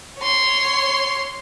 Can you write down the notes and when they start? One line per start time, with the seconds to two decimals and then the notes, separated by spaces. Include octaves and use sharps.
0.18 C#5 C6